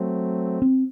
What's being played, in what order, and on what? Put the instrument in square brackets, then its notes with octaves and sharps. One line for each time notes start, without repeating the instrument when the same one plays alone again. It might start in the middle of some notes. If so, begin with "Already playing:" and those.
Already playing: [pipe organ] F#3 A3 C4
[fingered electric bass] C4